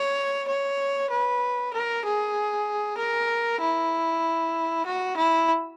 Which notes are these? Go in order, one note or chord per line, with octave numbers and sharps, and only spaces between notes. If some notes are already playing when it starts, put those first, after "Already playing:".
Already playing: C#5
C#5
B4
A#4
G#4
A#4
E4
F#4
E4